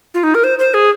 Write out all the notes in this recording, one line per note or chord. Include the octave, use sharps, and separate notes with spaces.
F4
D#4
A#4
C5
C5
G#4